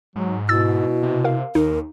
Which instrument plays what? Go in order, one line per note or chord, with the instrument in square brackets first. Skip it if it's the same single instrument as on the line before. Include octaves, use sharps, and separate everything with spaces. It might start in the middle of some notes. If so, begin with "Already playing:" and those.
[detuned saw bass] G#2 [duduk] F#3
[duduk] B2 [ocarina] E4 [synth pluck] E6 A6
[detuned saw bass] C3
[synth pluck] A#4 F5
[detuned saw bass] D#2 [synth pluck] D#4 [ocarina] A#4